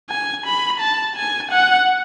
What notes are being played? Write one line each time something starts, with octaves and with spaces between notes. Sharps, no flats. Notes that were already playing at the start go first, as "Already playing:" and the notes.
G#5
B5
A5
G#5
F#5